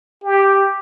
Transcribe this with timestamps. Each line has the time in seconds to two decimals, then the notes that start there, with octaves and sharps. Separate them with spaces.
0.24 G4